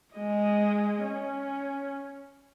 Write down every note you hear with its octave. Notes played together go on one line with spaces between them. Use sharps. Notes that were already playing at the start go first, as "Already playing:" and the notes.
G#3 D#5
C#4